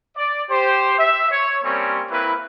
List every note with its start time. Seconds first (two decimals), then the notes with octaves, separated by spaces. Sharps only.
0.17 D5
0.50 G4 C5
0.98 E5
1.31 C#5
1.64 G3 A#3 C4 C#4 C#5
2.10 A#3 C4 E4 B4